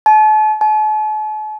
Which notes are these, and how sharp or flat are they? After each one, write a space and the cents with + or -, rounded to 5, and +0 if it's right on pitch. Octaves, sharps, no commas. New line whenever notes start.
A5 -40
A5 -45